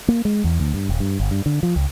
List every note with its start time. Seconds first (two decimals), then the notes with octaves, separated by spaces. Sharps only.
0.08 A#3
0.25 G#3
0.44 E2
0.60 D2
0.74 G2
0.89 D#1
1.00 G2
1.20 G1
1.31 G2
1.46 D3
1.63 F3
1.76 C#2